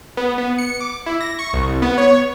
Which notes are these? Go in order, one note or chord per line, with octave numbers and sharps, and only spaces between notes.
B3
B3
C#7
D6
E4
A#6
C#6
C2
C2
B3
C#5